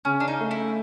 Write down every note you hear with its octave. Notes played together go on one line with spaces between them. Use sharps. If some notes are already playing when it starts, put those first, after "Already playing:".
C#3 C#4
D4
D#4
A3
E4